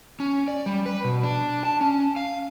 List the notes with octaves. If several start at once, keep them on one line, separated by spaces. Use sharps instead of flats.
C#4
D5
G3
B4
B2
D4
A5
C#4
F5